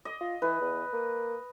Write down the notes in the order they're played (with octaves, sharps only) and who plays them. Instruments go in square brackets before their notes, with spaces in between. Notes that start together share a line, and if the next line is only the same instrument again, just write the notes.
[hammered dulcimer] D#5
[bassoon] F4
[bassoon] E3 [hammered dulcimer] B4
[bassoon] E2
A#3